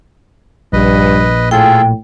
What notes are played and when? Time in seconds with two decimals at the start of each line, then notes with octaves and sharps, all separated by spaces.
0.73 A#1 G2 B4 D#5
1.51 A2 F4 G#4 A4 G5